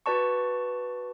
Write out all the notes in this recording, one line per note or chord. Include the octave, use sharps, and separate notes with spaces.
F#4 B4 D5 A5 C#6